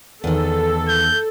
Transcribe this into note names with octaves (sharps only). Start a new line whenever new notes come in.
E2 D#3 A4
G6